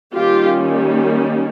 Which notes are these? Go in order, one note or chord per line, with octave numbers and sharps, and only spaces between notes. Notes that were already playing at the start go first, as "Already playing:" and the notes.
D#3 G3 A#3 C#4 F4 G4